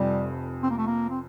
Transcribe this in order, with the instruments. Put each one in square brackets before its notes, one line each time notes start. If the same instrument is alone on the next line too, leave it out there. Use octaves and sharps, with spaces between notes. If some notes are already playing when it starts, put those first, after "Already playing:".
Already playing: [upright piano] F1 F2 C3 [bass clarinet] G3
[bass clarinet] C4
A#3
A3
A#3
C4